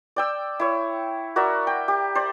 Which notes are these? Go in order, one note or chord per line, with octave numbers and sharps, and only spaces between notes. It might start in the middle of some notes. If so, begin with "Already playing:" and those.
D5 G5 E6
E4 C#5
F#4 A#4 D5 E5
G5
G4
C5 D5